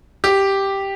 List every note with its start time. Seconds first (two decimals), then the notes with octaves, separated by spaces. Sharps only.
0.24 G4